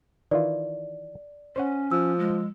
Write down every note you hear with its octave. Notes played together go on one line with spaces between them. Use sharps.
D#3 E3 F4 D5
C#4 C5 C#5 F#5
F3 E6
G#3